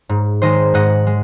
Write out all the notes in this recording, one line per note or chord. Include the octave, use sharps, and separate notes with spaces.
G#2
D#3 G#3 C5 D#5
G#2 D#5 F#5
G#3